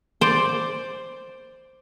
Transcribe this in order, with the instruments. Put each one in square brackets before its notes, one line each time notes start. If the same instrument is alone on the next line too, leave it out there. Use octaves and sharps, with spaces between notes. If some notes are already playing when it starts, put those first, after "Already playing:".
[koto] C5 D5